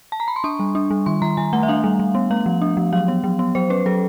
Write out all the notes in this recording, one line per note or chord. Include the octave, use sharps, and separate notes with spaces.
A5
A#5
B5
C6
D4 C#6
G3
D4
G3
D#3 C6
D#3 A#5
D#3 G#5
A3 F#5
E5
D4 F5
G3
G3
B3
A3 F5
F3
D4
F3
F#3 F5
B3
F#3
B3
F#3 C5
C#4 B4
F#3 A4